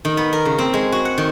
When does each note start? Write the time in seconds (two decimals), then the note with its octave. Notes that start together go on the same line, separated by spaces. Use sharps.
0.05 D#3
0.17 B3
0.33 A#4
0.45 C#3
0.59 C4
0.74 G#3
0.92 F#4
1.05 F#5
1.18 D#3